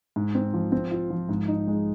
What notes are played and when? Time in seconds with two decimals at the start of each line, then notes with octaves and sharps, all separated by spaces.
0.16 G#2
0.35 C4
0.54 F3
0.72 C4
0.91 F4
1.10 F3
1.29 G#2
1.48 D#4
1.67 G#3